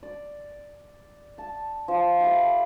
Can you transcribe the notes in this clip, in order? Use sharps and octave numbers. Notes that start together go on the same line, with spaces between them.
D5
A5
F3
G4 A4 E5 B5